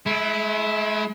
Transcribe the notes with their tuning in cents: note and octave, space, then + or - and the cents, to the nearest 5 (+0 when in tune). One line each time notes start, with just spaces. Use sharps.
G#3 +40 E4 +0